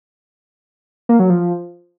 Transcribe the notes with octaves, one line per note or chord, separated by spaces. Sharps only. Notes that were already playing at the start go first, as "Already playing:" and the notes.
A#3
F#3
F3